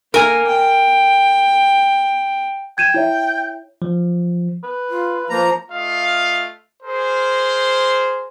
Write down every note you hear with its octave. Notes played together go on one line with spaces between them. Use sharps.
A#3 A#4 G#5
G5
G5 G#6 D#7 E7
E4 C#5 E5
F3
B4
F4
F3 A#3 A#5
A3 F4 D#5 F5
G#4 A#4 C5